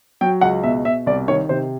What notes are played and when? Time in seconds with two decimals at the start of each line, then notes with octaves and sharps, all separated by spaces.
0.21 F#3 G5
0.41 C#2 F#5
0.63 B2 E5
0.85 B2 E5
1.06 C2 D5
1.28 D#3 C#5
1.49 C3 C5